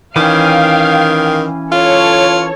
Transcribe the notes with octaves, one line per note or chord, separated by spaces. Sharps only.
D#3 E3 C#4 F5 G5
F4 A4 C#5